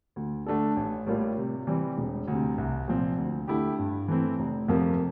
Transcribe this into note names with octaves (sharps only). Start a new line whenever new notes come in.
D2
D3 A3 D4 A4
A1
A2 G3 A#3 F4
C3
E3 G3 C4
E1
D2 C3
C2
A#2 F3 C4
D2
D3 A3 E4 G4
G2
E3 A3 C4 E4
F1
F2 C3 F3 A#3